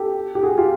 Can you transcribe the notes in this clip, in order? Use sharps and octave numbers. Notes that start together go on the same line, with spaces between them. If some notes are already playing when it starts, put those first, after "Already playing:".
Already playing: G4 A4
G4
F#4 G#4
F4 G4